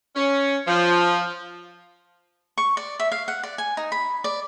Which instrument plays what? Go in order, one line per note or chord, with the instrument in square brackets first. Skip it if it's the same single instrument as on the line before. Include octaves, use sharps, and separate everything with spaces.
[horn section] C#4
F3
[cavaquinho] C#6
D5
E5
F5
F#5
D5
G#5
D#4
B5
D5